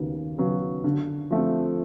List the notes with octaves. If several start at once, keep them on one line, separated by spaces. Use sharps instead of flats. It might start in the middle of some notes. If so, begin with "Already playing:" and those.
Already playing: D#2 C#3 F#3 B3
C#3 F#3 B3
D3
F3 A3 C4